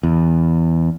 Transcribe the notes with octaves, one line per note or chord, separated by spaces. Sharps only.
E2